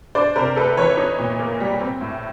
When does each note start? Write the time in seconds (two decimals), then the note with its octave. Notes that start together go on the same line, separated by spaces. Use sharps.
0.15 D4 C5 D5
0.36 C3 A#4 C5
0.56 A3 A4 B4
0.77 E3 B4 C#5
0.97 D#4
1.19 A#2
1.39 A#3
1.60 G3
1.81 C4
2.01 A2